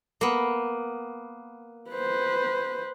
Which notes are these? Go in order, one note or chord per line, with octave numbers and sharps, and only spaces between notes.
A#3 B3
B4 C5